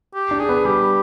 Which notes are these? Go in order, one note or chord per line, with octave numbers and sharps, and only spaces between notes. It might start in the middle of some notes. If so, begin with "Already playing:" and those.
G4
D4
G#4
B3
G3 G4